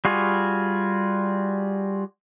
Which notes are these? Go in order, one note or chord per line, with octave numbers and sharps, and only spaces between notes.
G3 F4 F#4 G#4